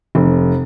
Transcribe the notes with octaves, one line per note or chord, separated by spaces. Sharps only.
F1